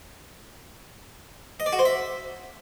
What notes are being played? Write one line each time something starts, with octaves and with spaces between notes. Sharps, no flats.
D#5
D5
F#4
C5
E5